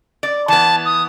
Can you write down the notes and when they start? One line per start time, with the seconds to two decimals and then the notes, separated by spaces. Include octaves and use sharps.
0.23 D5
0.48 E3 B3 A5
0.85 D#6